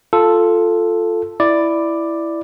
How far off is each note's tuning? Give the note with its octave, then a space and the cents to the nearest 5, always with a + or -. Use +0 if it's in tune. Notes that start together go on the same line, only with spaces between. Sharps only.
F4 +0 A4 +0
E4 +5 D5 +5